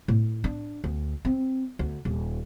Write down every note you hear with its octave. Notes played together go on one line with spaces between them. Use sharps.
A2
D4
D2
C4
D2
D#1